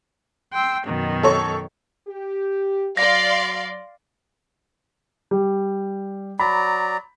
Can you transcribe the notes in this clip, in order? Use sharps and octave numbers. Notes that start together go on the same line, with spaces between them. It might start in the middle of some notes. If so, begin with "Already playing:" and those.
G5 C6 E6
F#2 B2 D#3
A4 C#5 C#6
G4
F#3 D5 F5 C6 A#6
G3
F#3 D5 A#5 B5